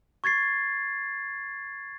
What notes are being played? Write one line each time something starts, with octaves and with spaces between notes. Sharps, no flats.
C#6 G#6 A6 C7